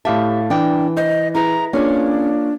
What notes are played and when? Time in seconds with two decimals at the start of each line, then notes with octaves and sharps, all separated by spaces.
0.05 A2 G4 E5 F5 A5
0.50 E3 D4 G5
0.97 C5 D#5
1.35 E4 G#4 B4 A#5
1.73 A#3 C#4 D4 F4 G#4 C#5